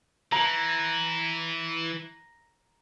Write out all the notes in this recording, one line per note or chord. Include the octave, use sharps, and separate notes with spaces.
E3 A#5